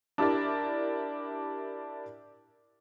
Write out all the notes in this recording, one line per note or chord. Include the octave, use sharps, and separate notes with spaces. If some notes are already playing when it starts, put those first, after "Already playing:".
D4 E4 G4 A#4 D5